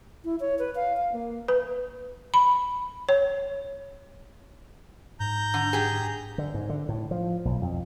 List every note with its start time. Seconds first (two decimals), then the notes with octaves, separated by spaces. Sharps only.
0.25 E4
0.40 C#5
0.59 B4
0.76 F5
0.97 F5
1.12 A#3
1.48 B4
2.34 B5
3.09 C#5
5.20 G#2 A#5 G6
5.54 D3
5.73 G4 G#4
6.38 D3
6.54 G#2
6.69 D3
6.89 A2
7.11 F3
7.45 B1
7.62 F2